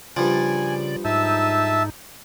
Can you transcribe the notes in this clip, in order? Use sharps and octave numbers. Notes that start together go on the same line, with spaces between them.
G2 C#3 F3 D5 G#5
G#2 D#4 E5 A5 E6